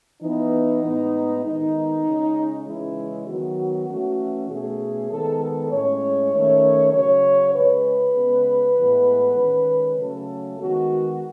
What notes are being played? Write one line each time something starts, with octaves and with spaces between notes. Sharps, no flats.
E3 B3 D#4
A2 G#3 B3
D#3 G#3 B3 D#4
C#3 G#3 C#4
C#3 E3 G#3 C#4 E4
D#3 F#3 B3 F#4
E3 A3 C#4
B2 A3 C#4 G#4
D#3 G#3 B3 A4
A4
A2 G#3 C#4 C#5
D#3 A3 C#4
C#3 F#3 C#4 C#5
C#3 G#3 C#4 B4
C#3 G#3 B3
A2 E3 G#3 B3
D#3 G#3 C#4
C#3 F#3 A3 C#4 A4
D#3 G#3 B3 F#4